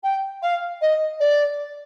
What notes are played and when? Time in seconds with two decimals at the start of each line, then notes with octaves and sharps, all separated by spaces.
0.03 G5
0.42 F5
0.81 D#5
1.20 D5